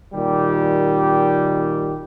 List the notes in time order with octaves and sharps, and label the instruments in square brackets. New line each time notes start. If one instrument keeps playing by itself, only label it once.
[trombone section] A#2 D#3 G3 G4